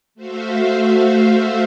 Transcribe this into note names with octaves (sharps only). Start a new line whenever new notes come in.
A3 F#4 C5 E5 F5